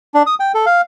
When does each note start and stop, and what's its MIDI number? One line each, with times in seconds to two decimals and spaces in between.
0.14 0.23 62
0.26 0.35 87
0.40 0.52 79
0.54 0.66 69
0.66 0.81 77